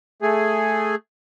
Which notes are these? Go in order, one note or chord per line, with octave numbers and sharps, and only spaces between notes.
A3 G#4